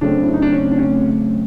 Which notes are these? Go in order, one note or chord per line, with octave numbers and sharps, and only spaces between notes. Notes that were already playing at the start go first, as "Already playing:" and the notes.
C#3 F#3 A3 C4 D4
E4
D#4
D4
C#4
D4
C#4